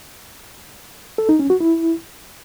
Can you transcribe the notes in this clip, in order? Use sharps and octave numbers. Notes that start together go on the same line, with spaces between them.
A4
D#4
C#4
F#4
E4